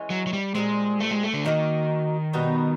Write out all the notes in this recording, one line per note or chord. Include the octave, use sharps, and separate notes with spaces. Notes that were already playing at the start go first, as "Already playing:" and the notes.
Already playing: E3 G#3 C#4
F#3
F#3
G3
A#2 G3 G#3 C4
A3
G#3
A3
D3
D#3 A#3 D#4 F#4 A#4
B2 G3 B3 D#4